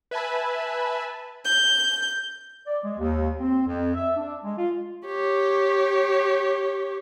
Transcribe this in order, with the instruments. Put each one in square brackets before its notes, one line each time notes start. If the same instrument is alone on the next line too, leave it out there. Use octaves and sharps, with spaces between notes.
[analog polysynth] B4 E5 G#5 A5 B5
[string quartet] G6
[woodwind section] D5
G#3
D#2
C4
F2
E5
D4
G#3
F4
[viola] G4 C#5